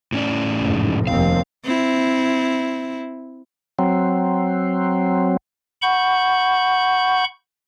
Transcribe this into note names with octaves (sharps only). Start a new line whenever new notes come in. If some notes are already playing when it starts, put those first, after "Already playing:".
A2 C#4 D5
F1 G#2
F1 D#2 C4 F5
C4 E4
F#3 C4
F#5 B5 C#6 G6